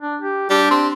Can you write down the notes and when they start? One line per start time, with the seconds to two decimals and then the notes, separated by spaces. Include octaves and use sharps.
0.01 D4
0.22 G4
0.50 G3 D4
0.71 C4